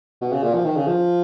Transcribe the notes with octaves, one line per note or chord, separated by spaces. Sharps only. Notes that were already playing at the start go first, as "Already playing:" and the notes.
B2
C#3
A#2
F3
D#3
C#3
F3